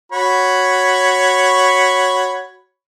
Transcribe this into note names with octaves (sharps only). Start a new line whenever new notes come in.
F#4 C#5 B5